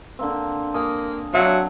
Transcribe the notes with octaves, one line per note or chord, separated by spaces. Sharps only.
D3 A#3 C4
A#3 G#5 D#6
F#3 C4 D4 E5 F5